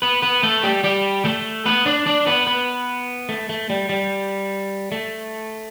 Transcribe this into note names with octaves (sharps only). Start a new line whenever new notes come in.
B3 B4
B3 B4
A3 A4
G3 G4
G3 G4
A3 A4
B3 B4
D4 D5
D4 D5
B3 B4
B3 B4
A3
A3
G3
G3
A3